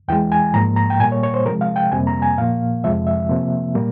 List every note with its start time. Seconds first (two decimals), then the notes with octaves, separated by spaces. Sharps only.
0.08 E2 E3 G#3 G5
0.32 G#5
0.54 G#2 F3 A#3 A#5
0.76 A#5
0.90 G5
1.00 A#2 G3 A#3 G#5
1.12 C#5
1.23 C#5
1.34 C5
1.45 C3 F3 G#3 A#4
1.61 F5
1.76 G5
1.92 F2 C3 G3 A#3 G#5
2.07 A#5
2.22 G#5
2.38 A#2 F3 A#3 F5
2.84 F2 C3 F3 G#3 E5
3.07 E5
3.29 C3 F3 A#3
3.75 A#2 G3 A#3